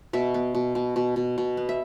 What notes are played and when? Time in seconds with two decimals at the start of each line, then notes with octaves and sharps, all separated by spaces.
0.13 B2 E5
0.34 B3
0.55 B2
0.75 B2
0.96 B2
1.16 B2
1.38 B2
1.57 B3
1.69 E5